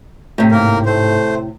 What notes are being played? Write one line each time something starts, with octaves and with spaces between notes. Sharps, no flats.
A2 C3
G#2 A#3 A#4
A3 C5